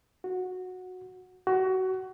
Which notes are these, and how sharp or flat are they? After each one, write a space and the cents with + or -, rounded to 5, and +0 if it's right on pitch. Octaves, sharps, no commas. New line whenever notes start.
F#4 -10
F#4 +25